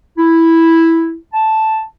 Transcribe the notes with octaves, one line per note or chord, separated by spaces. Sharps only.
E4
A5